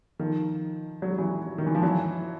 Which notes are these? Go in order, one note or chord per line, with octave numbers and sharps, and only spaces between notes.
D#3 F3
F#3
G3
E3 F#3
D#3
E3
F3
E3 F#3